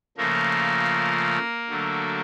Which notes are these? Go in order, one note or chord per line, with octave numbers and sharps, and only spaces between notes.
C#3 F3 A3 A#3 A#4
D3 F#3 A3